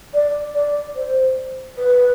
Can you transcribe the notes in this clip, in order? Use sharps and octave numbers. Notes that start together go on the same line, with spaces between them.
D5
D5
C5
B4